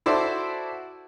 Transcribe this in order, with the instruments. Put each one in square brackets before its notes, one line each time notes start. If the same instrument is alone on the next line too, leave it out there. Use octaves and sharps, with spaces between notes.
[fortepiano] E4 F#4 A4 C5 D5